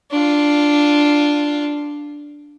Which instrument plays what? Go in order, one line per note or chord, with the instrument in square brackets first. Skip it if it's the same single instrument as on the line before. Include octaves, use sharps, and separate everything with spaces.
[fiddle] D4 F4